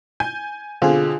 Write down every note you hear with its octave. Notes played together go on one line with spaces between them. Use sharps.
G#5 G6
B2 D3 C4 F4 G#4